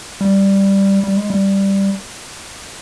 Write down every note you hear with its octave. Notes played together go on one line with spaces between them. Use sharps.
G3
G3
G#3
G3